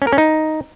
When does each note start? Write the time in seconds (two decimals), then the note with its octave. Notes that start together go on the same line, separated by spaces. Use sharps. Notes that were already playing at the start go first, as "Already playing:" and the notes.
0.02 C#4
0.07 A#4
0.13 C#4
0.18 D#4